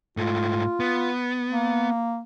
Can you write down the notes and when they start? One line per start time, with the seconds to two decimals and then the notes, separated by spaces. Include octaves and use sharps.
0.17 G#2 A3 F4
0.80 B3
1.49 A#3